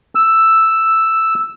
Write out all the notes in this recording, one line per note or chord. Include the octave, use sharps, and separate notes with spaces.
E6